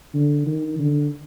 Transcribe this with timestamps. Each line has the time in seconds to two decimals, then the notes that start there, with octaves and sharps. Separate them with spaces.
0.14 D3
0.46 D#3
0.79 D3